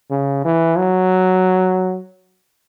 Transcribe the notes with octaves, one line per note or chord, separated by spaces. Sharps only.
C#3
E3
F#3